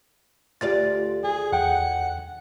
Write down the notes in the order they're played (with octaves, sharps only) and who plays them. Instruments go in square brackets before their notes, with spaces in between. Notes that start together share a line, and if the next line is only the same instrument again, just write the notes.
[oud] D2 F4 D5 [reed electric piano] G4 A6
[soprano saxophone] G#4
[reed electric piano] E2 G5 [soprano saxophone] F#5